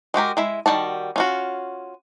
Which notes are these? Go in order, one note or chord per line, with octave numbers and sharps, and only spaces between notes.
G#3 F#4 G4 A#4
G#3 E4 E5
D#3 G3 F#4 A5
C#4 F4 F#4